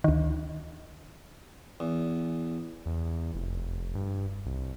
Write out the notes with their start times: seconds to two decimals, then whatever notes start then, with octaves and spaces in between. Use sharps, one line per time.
0.04 D2 D#3
1.80 E2
2.86 E2
3.34 F1
3.95 G2
4.46 C2